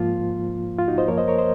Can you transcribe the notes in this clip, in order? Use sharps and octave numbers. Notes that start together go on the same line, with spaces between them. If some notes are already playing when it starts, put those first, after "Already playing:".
Already playing: G#2 F3 A#3 F4
F4
D#4 F#4
C5 D#5
F#2 F3 A#3 A#4 C#5
C5 D#5
A#4 C#5
C5 D#5